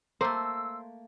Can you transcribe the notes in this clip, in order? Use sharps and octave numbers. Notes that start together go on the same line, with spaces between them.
A3 A#3 C5 E6